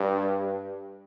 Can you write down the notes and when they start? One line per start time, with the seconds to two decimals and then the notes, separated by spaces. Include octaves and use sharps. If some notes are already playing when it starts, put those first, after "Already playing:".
Already playing: G2